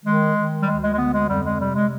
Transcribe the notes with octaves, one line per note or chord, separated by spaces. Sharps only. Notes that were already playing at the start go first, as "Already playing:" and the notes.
D#3 G#3
D#3
G3
D2 G#3
G#3
G#3
D3 B3
G#3
F2 G3
G#3
C3 G3
G#3